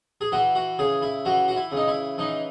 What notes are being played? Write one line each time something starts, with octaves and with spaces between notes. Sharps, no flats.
G#4
E3 F#4
F#4
C#3 G#4
E4
E3 F#4
F#4
E4
C#3
D#4
E4
E3 D#4